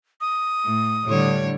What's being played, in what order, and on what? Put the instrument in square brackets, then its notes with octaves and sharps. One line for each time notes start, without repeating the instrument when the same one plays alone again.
[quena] D#6
[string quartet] A2
[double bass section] A2 D3 [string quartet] G3 C#5